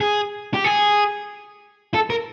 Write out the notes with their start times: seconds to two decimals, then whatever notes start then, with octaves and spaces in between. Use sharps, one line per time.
0.01 G#4
0.54 G4
0.64 G#4
1.94 A4
2.10 A#4